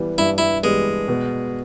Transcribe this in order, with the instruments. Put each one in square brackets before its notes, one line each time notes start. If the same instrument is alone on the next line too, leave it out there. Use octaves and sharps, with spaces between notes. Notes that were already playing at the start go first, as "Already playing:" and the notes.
Already playing: [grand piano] E3 G3 B3
[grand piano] G2 [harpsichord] E4
[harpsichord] E4
[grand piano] E3 G3 B3 [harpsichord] G#3
[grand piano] B2